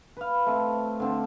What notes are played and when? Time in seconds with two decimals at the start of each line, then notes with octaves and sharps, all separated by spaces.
0.17 B4 F5
0.46 A3 C4
1.00 D3 C4 D4